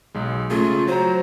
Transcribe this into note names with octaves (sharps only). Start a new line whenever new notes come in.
B1 G#3
C#3 A3 F4 G#4
F#3 C5 A#5